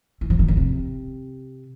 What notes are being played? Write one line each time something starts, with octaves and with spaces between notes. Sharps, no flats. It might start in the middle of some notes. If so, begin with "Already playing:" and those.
E3
F3
E3
D3
C3